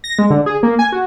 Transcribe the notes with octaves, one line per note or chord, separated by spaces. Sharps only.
A#6
G#3
D3
G#4
A#3
G#5
F#4